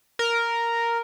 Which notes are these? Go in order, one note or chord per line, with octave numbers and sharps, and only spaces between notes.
A#4